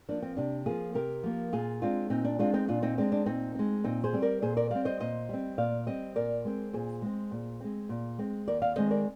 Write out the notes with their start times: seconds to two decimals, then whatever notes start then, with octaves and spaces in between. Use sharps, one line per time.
0.09 F3 A#3 D4
0.22 C4
0.36 C3 D4
0.66 F3 A#3 F4 G#4
0.95 C3 G4 A#4
1.23 F3 A#3
1.53 A#2 F4 G#4
1.82 G#3 C4 D4 F4
2.10 A#2 C4 D#4
2.24 D4
2.39 G#3 C4 D4 F4
2.54 C4 D#4
2.68 A#2 D4 F4
2.82 C4 D#4
2.98 G#3 C4 D4
3.12 D4
3.26 A#2 C4 D#4
3.55 G#3 C4
3.84 A#2 C4 D#4
4.04 G#4 C5
4.13 G3 C4
4.22 A#4 D5
4.42 A#2 G#4 C5
4.57 A#4 D5
4.71 G3 C4 D5 F5
4.85 C5 D#5
5.00 A#2 C5 D#5
5.29 G3 C4
5.58 A#2 D5 F5
5.86 G3 C4 C5 D#5
6.15 A#2 A#4 D5
6.45 G#3 C4
6.73 A#2 G#4 C5
7.02 G#3 C4
7.31 A#2
7.60 G#3 C4
7.89 A#2
8.18 G#3 C4
8.47 D#2 A#4 D5
8.62 D5 F5
8.76 D#3 G#3 C4 C5 D#5
8.91 A#4 D5